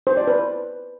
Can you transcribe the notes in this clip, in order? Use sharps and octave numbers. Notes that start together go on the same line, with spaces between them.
C5
D5
B4